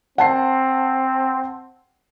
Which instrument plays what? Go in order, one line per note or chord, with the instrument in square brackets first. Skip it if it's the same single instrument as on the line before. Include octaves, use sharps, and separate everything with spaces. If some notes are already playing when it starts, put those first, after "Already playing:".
[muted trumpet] C4 [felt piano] F#5 A5 C7